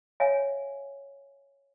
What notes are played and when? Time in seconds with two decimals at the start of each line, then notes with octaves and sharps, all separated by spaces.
0.20 C#5 E5 F5 G#5